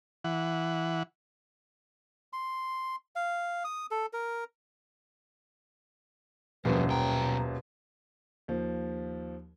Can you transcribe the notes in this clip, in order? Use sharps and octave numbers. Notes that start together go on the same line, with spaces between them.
E3 F#5
C6
F5
D#6
A4
A#4
D#1 F#2 B2 D3 F3 B4
B1 G5 A#5
D#2 F3